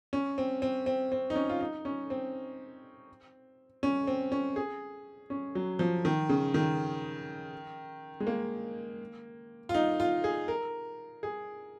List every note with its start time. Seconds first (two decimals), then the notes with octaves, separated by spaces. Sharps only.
0.13 C#4
0.38 C4
0.62 C4
0.86 C4
1.12 C4
1.30 D#4
1.35 C#4
1.49 F4
1.61 D#4
1.85 C#4
2.10 C4
3.83 C#4
4.07 C4
4.32 C#4
4.56 G#4
5.30 C#4
5.55 F#3
5.79 F3
6.05 D#3
6.29 C#3
6.54 D#3
8.20 G#3
8.27 A#3
9.69 F4
9.74 D#4
10.00 F4
10.24 G#4
10.48 A#4
11.23 G#4